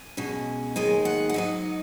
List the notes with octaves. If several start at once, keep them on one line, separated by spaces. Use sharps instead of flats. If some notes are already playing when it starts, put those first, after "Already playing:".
Already playing: G#5
B2 G#3 C#4
D#2 D#3 G#3 D#4 G#5
F#5
F#5
G#2 F#3 D#4 D#5